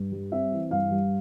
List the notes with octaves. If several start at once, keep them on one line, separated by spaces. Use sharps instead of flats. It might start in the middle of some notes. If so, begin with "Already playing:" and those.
Already playing: G2
G3
C4 E5
E3
G2 F5
G3